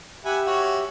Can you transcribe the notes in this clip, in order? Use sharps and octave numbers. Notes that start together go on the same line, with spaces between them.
G4 E5 F#5 G#5 B5
C#4 F#4 C#5